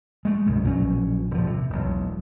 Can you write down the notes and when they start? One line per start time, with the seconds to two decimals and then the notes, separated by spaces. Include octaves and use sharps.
0.25 G#3 A3
0.46 C2 F#2 B2
0.64 A#1 B2 F#3 C#4
1.31 D#1 F3
1.47 C3
1.70 E1 B1